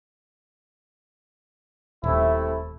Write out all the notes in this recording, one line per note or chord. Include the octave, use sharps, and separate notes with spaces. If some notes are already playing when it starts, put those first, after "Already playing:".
D#1 C3 A3 E4